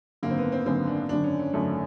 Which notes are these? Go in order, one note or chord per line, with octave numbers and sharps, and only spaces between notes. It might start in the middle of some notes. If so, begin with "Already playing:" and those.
G#1 F#2 D3 A#3
C4
B3
C4
G#1 F#2 D3 C4
D4
G#1 F#2 D3 D4
C#4
C#4
G#1 F#2 D3 A3